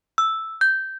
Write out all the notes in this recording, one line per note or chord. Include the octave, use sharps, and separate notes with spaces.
E6
G6